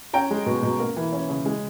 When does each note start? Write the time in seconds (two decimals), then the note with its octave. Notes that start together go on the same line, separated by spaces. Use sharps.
0.14 C#4 G5 A#5
0.31 G#3
0.46 B2
0.63 B2
0.80 A#3
0.97 E3
1.13 C#4
1.29 C#3
1.46 G#3